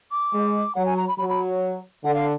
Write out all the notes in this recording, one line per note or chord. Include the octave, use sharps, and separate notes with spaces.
D6
G#3
F#3 F#5
G#5
A#5
B5
F#3 B5
B5
D3 F#5
F5